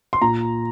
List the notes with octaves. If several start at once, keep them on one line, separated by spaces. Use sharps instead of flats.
C6
A#2 A#5